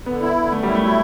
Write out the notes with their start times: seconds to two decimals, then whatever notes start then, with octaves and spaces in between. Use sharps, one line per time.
0.06 D3 B3
0.21 B3 E4
0.36 D3
0.51 F#2 A3
0.63 G3
0.67 E4
0.75 A3
0.82 F#3 E4